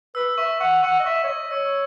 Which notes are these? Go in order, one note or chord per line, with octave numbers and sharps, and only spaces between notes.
B4 E6
E5 C#6
F#5 C#6
F#5 C#6
D#5
E5 C#6
C#5
D#5 C#6
C#5 E6